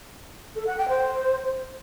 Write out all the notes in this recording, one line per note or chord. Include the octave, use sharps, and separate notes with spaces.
A4
F#5
G5
C5